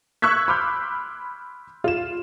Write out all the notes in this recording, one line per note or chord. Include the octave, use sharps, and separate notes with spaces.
C#6 E6 F#6 G#6 B6
B5 C6 D6 F6 G6
F4 E7